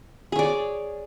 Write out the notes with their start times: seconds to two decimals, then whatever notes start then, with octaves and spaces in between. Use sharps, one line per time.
0.32 G#4
0.36 C#5
0.39 D5